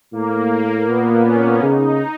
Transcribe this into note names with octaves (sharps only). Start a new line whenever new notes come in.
A2 A#3
A#2 B3
C#4
C#3 D#4